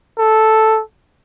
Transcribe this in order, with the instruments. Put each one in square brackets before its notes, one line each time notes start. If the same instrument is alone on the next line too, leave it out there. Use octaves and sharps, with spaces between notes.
[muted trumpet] A4